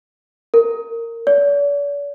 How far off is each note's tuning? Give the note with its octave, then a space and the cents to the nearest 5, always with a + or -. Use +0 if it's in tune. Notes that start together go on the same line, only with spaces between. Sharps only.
A#4 -15
D5 -45